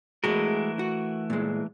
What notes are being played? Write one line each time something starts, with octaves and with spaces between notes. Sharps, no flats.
E3 G#3 A3 F#4 G#4 A#4
F#4
A#2 G#3